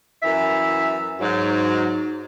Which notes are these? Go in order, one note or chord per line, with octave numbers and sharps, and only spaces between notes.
F#2 E3 E5
G#2 F#3